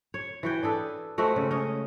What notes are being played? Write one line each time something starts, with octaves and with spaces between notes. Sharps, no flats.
C#5
E3 F#4 G5
D4 G#4 A4 B4
G#3 A3 C4 F#4
C#3
C#4 D#5